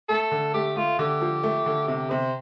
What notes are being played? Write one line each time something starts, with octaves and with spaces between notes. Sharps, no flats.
A3 A4
D3
A3 G4
A3 F4
D3 G4
F3
A3
D3
C3 G4
C3 C5